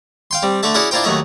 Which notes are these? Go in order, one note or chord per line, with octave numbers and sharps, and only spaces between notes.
F5 G5 C6
G3 C4
D3 A3 E5 A5
C#4 E4 F#4 G#4 D5 F#5
D4 E4 F4 A#4 C5 G5
D#2 F#3 A3 D#5 E5